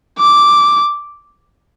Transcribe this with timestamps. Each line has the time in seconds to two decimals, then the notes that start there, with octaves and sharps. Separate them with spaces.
0.19 D6